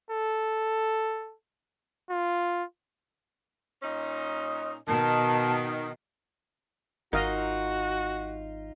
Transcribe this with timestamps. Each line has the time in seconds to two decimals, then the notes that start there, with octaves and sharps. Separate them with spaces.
0.11 A4
2.10 F4
3.83 A#2 C#4 D#4
4.88 B2 D#3 A5
7.13 G#1 D#4 F4 F#4 A#4 D#5 F5